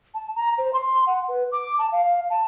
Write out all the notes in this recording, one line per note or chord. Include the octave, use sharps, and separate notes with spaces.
A5
A#5
C5
C6
F#5
B4
D6
A5
F5
A5